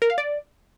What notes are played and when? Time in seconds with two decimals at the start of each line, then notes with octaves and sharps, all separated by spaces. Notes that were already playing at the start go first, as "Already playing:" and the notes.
0.02 A#4
0.10 F5
0.18 D5